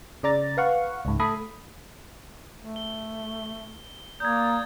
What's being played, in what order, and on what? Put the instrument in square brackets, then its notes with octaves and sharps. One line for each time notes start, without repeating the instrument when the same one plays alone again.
[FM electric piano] C#3 D5 A#5 A6
B4 F5 F#5 C#6
C#2 G#2
A3 A4 B5 D#6
[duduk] A3
[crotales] G7
[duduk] A#3 [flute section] D5 A#5 D#6 [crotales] G6 G#6